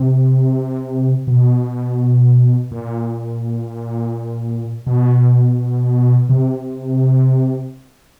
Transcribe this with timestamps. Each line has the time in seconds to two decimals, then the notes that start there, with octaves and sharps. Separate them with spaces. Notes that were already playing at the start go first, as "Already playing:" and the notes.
Already playing: C3
1.27 B2
2.71 A#2
4.86 B2
6.29 C3